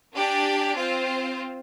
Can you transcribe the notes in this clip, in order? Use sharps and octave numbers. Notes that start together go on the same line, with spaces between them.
D4 G4 D5 G#5
C4 F4 C5